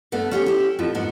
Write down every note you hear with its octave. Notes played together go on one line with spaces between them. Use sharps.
G2 A3 B3
C#4 G4 G#4
E4 G4
F2 A2 F3
G#2 B3